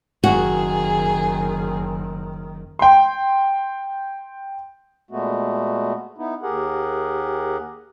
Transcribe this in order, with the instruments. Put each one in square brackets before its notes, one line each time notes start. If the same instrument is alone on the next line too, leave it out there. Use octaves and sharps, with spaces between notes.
[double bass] F#1 D#3 [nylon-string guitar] F#4 [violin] G#4
[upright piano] G5 C6
[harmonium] A#2 G#3 A3 B3 F#4
B3 D#4 E4
D#2 G4 G#4 A#4 F#5